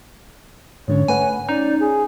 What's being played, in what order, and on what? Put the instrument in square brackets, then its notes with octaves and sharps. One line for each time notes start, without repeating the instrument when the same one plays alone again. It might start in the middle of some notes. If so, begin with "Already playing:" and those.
[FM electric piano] G#2 D3 C#4 [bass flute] C#5
[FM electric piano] A3 B4 F#5 [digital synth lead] G#5
[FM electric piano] C#4 [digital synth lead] D#4 [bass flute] D5
[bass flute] G#4